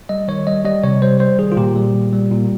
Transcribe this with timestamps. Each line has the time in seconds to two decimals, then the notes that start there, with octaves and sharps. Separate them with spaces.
0.09 G3 D#5
0.28 D#3 C#5
0.47 G3 D#5
0.65 G3 D#5
0.83 C3 C#5
1.02 G3 C5
1.20 G3 C5
1.39 D#3 G#4
1.52 F4
1.57 A#2 G4
1.76 G3
1.95 A#2
2.13 G3
2.31 A#2